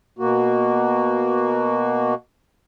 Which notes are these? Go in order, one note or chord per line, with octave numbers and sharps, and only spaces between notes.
B2 A#3 F#4